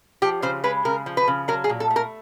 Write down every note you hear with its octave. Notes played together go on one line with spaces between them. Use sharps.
F3 G4
C#3 C5
G#3 B4
C#3 A#4
F3
B4
C#3
F#3 A#4
G#4
A#2
A4
A3
A#4